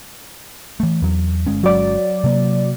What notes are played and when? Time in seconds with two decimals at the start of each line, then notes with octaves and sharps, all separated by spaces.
0.80 E3 A3
1.02 E2 F#3
1.46 G1 G#3 C#4
1.63 F#3 D5
2.24 C3 A#3